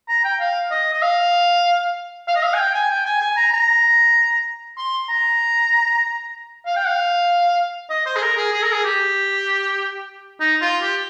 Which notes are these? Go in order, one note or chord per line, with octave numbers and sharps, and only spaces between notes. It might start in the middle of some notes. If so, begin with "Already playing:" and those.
A#5
G5
F5
D#5
D#5
F5
F5
D#5
F5
G#5
G5
G#5
G5
G#5
G#5
A#5
A#5
C6
A#5
F5
G5
F5
D#5
C5
G#4
A#4
G#4
G#4
A#4
G#4
G4
D#4
F4
G4